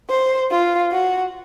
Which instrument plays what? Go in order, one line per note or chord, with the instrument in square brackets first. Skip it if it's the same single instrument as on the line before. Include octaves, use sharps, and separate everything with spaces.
[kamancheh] C5
F4
F#4